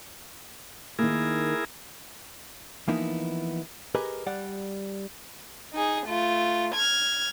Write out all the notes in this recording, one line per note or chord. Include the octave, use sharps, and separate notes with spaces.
D#3 A#3 E4 G#4 A#4
E3 F3 A#3 B3 D#4 E4
G4 G#4 A#4 B4 D#5
G3 D5 F#5
D#4 G#4
A3 F4
F6 G#6